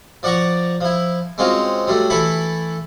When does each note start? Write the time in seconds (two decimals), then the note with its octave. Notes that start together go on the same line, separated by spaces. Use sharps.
0.23 F3 D5 F#5 A#5 C#6
0.81 F3 E4
1.38 G#3 C4 C#4 F4 F#4
1.87 F#3 G3 A3
2.10 E3 A3 E4 A4 A5 B5